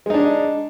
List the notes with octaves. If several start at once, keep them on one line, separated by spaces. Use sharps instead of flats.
G#3 D4 D#4